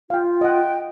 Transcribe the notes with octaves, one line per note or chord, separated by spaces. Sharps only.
F4 F5 G5
D#5 F#5 G5